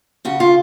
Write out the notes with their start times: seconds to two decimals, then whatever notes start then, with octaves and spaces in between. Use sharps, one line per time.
0.25 C#3 F#4
0.40 F4